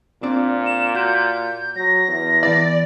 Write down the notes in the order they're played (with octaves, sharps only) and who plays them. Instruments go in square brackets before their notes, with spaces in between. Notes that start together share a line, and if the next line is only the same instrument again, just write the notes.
[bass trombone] A#2 [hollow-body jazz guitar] C4 D4 D5
[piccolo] E7
[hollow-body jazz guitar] F#4 [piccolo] G6
[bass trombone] F#3 [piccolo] A#6
[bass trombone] E2
[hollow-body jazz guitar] E3 B3 E4 [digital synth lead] D5